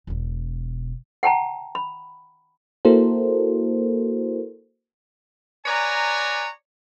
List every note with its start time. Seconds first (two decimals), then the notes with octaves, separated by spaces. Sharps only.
0.07 E1 B2
1.23 F#5 G5 A5 A#5
1.75 B5
2.85 A#3 E4 F#4 A4 A#4 C5
5.66 B4 C#5 D5 G#5 A#5